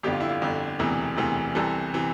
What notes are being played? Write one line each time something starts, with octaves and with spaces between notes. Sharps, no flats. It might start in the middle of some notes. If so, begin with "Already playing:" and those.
G1 F2 D3 G4
F4
E4
F4
G1 F2 D3
E1 D2 C3 E3
E1 D2 C3 E3
C2 C3 E3 A4
C3 E3